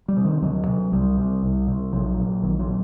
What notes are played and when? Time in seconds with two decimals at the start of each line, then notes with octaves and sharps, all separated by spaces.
0.08 G3
0.17 C3
0.25 D#3
0.42 D2 F#3
0.67 C3
0.92 C2 G3
1.17 C3
1.43 C2
1.67 C3
1.93 A#1 F#3
2.18 A#2
2.43 A#1 D#3
2.59 F#3
2.68 A#2